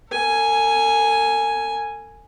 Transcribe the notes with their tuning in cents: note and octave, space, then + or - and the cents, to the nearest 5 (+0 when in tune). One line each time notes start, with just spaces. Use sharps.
A4 +45 G#5 +0